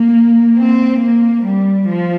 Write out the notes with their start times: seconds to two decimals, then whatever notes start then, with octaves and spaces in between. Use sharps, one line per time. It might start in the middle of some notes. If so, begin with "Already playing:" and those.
Already playing: A#3
0.56 C4
1.00 A#3
1.44 G3
1.88 F3